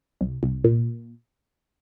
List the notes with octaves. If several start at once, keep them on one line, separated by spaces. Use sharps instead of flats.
C2
C2
A#2